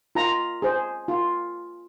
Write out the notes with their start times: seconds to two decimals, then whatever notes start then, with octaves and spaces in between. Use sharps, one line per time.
0.15 F4 A#5
0.62 G#4 C5
1.08 F4